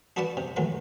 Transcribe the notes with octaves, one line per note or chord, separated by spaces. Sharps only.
D4 F#4 B4 D5 F#5 A5
C3
A2 D3 E3 F#3